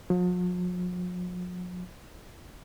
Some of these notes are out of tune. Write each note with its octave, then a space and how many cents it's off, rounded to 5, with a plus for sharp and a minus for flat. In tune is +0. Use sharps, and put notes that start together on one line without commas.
F3 +45